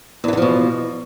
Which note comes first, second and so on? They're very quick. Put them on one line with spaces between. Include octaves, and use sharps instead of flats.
E2 E3 D3 F3 B2